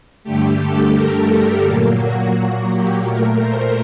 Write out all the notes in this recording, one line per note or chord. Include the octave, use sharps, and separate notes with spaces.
G2 D3 A3 G4
A4
A#4
A4
A#2 F#3 A#3
F#4
F#4
G4
A#2 A3 A#4
C5